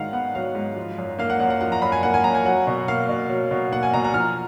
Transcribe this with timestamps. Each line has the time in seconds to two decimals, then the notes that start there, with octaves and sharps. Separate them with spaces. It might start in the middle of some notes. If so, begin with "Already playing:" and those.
Already playing: G#2 D#3 F#3 F5 F#5
0.13 B3 F#5
0.35 F#3 F5
0.55 G#2
0.76 F3
0.98 F#2
1.19 A#3 F5
1.30 F#5
1.40 F#2 F#5
1.50 F#5
1.61 F3 F#5
1.72 A#5
1.82 F#2 B5
1.92 G#5
2.03 A#3 F#5
2.14 G#5
2.24 F#2 A#5
2.35 G#5
2.45 F#3 F#5
2.67 B2
2.88 A#3 F5
3.09 B2
3.29 F#3
3.51 B2
3.72 A#3 F#5
3.83 G#5
3.94 B2 A#5
4.04 A#5
4.14 F3 F6